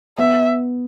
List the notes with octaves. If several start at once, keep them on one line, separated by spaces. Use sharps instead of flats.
B3 E5